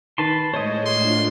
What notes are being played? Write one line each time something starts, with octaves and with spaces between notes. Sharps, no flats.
D#3 B4 A5 C6
A2 G#3 C5 C#5 D#5 D#7
A2 D4 F4 C6